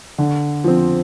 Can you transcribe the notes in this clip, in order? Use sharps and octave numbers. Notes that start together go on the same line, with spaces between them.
D3
F3 C4